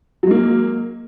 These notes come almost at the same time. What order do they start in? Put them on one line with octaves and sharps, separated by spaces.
F#3 G#3 A#3